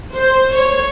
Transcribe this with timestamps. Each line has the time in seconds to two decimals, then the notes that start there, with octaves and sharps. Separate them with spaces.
0.15 C5
0.55 C#5